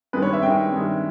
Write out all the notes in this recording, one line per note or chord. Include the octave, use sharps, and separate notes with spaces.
G2 D#3 G#3 B4
C#5
E5
G2 D#3 G#3 G5
G2 D#3 G#3